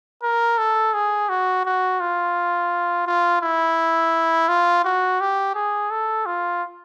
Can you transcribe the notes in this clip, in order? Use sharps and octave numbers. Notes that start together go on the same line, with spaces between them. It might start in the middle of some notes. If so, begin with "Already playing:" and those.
A#4
A4
G#4
F#4
F#4
F4
F4
E4
F4
F#4
G4
G#4
A4
F4